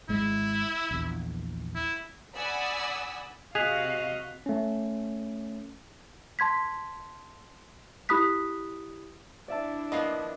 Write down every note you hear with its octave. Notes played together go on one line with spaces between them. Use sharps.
G#1 G#3 E4
A#1 E2
E4
D5 F#5 G#5 B5 D#6 E6
C3 F#4 G#4 D#5 F5 F#6 B6 F7
A3 C#4
A5 C6 G#6 B6
E4 G4 B5 D#6 F#6 B6
D4 E4 D5 E5 A5
F3 A#3 B3 D#5 C7